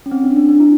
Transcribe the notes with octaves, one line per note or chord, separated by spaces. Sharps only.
C#4
C4
D4
D4
D4
E4